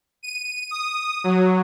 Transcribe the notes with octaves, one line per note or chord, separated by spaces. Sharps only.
D#7
D#6
F#3